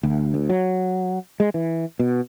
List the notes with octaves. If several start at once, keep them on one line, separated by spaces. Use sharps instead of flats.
D2
D2
F#3
G#3
E3
B2